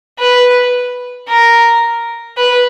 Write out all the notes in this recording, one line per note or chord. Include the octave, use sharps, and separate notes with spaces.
B4
A#4
B4